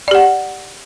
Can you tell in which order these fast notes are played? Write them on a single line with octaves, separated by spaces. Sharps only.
D5 G4 F#5